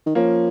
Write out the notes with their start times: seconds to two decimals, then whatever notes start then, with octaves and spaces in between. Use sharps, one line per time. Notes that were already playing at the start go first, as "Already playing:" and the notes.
0.06 D#3
0.15 F3 A#3 C#4